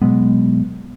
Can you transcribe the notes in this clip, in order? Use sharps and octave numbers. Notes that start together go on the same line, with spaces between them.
B2 F#3 G#3 B3